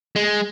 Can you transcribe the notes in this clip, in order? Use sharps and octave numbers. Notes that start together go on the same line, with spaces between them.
G#3